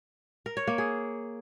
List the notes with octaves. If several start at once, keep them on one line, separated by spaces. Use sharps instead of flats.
A#4
C#5
A#3
G#4